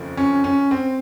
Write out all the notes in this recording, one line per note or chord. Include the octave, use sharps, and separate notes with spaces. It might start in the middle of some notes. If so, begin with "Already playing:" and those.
Already playing: F1 D#2 C#3 F3
C#4
C#4
C4